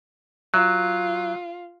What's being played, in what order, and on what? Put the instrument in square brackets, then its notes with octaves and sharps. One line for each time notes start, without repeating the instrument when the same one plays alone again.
[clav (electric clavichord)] F#3 [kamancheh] F4